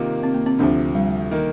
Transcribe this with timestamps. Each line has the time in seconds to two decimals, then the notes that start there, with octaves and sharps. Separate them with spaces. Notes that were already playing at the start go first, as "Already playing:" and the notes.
Already playing: C3 D#3 A#3 F4
0.23 C4
0.34 A#3
0.46 C4
0.59 D2 C3 F3 D4
0.95 G3
1.31 D#3 A#3